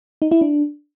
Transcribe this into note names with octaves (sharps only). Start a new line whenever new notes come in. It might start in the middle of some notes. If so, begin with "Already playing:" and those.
D#4
E4
D4